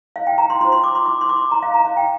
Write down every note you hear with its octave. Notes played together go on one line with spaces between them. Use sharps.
F5
G5
A#5
C6
F4 C5 C6
C6
D6
C6
D6
C6
D6
C6
A#5
F5
A#5
F5
G5